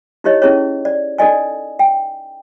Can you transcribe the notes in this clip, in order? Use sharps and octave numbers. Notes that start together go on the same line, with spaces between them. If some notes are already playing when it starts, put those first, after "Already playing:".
D#4 E4 G4 C#5 D#5
C#4 E4 G#4 C#5
D5
D#4 A4 D5 D#5 G#5
G5